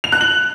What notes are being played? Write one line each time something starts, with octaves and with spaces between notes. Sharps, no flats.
F7
F#6
F#7